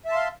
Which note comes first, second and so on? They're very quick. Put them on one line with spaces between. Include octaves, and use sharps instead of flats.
E5 A5 C6 F5